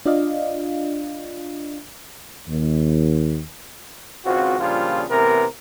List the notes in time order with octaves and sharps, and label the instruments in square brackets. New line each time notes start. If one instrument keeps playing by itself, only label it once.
[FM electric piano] D4 F4 D5 D#5 F5
[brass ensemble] D#2
[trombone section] G#1 C#2 C4 F4 F#4
A#2 C#3 F3 G3 D4 F4
A1 C3 E3 B3 A#4